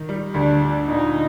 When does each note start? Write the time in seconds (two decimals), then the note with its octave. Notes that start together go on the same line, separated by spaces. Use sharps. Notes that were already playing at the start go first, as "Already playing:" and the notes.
Already playing: D#3
0.09 G3
0.34 D2 D4
0.62 D3
0.88 A#2 D#4